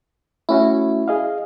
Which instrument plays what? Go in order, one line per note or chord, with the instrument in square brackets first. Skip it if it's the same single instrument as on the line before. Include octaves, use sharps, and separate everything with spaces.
[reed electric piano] A3 C#4 F#4 [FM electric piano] E4
[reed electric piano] G#4 D#5 F5